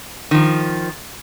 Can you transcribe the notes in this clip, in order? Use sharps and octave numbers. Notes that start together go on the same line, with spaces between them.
D#3 F3